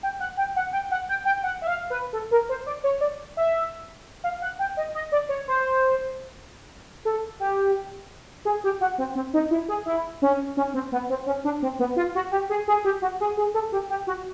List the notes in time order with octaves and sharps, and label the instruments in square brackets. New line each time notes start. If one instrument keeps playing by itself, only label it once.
[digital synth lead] G5
F#5
G5
F#5
G5
F#5
G5
G5
F#5
E5
F5
B4
A4
A#4
C5
D5
C#5
D5
E5
F5
F#5
G5
D#5
D#5
D5
C#5
C5
A4
G4
G#4
G4
F#4
C4
C4
D#4
E4
G#4
E4
C#4
C#4
C4
B3
C4
C#4
D4
C4
B3
F4
F#4
G4
G#4
G#4
G4
F#4
G#4
G#4
A4
G4
G4
F#4